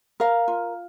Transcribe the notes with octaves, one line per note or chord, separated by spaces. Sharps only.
A#4 F5
F4